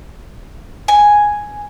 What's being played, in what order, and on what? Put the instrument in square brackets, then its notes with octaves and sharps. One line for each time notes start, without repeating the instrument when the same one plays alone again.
[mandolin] G#5